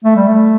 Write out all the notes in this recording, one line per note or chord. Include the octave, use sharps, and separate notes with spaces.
A3
G3
A3